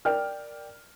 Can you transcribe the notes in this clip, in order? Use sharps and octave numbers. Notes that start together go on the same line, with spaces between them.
A#4 D5 G5 F6